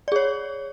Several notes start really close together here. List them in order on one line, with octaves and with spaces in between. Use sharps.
D5 G#4 C#5